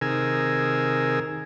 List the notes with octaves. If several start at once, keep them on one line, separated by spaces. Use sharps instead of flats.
C3 D#3 G#4 A#4 G#5 E6